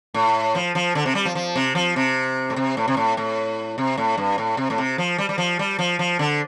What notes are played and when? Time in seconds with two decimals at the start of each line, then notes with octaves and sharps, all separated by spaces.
0.14 A2
0.55 F3
0.75 F3
0.95 D3
1.06 C3
1.15 G3
1.25 F3
1.35 F3
1.56 C3
1.75 F3
1.96 C3
2.50 A2
2.56 C3
2.77 A2
2.88 C3
2.97 A2
3.17 A2
3.78 C3
3.98 A2
4.17 G2
4.38 A2
4.57 C3
4.70 A2
4.78 C3
4.98 F3
5.18 G3
5.29 G3
5.38 F3
5.59 G3
5.79 F3
5.99 F3
6.19 D3